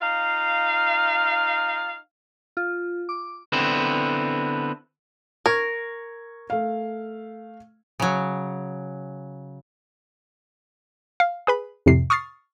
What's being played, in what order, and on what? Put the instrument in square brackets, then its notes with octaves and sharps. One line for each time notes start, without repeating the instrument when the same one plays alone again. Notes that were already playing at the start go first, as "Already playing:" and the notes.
[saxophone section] D#4 F4 F5
[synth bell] F4
D6
[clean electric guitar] D3 B3 C4 E4
[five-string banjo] A#4 [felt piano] C#6 G#6
[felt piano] A3 F5
[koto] C#3 F#3
[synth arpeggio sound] F5
G#4 B4 B5
F2 A2 C3 C7
C#6 D#6 F6 A6 C7